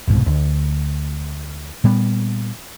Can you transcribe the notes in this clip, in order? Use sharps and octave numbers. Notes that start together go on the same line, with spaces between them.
D#1 C2 G#2 B2
D2
A#2 G3 B3